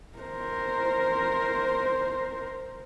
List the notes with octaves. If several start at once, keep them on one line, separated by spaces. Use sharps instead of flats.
A#4 C5